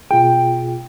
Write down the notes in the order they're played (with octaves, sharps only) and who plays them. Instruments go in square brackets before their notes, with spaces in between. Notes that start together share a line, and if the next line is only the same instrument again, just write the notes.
[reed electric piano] B2 F4 G#4 [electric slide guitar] G5